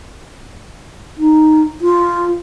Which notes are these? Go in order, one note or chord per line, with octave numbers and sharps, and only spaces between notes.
D#4
F4